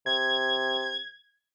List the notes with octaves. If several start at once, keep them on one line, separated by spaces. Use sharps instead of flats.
C3 G#6